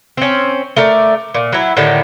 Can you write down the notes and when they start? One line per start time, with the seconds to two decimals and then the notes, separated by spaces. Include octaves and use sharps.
0.17 C4 C#4
0.77 A3 A#4 D5
1.35 A#2
1.53 F#3 E4
1.77 A2 D3 D#3 G4